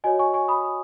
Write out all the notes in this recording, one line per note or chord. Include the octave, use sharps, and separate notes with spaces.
F#4 C#5 D#5 G#5
G#5 C#6
G#5 C#6
B5 D#6